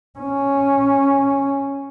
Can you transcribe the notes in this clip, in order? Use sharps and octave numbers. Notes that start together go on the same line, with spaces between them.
C#4